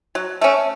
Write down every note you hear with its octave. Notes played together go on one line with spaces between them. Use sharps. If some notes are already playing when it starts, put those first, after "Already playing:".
F#3
A3 C#4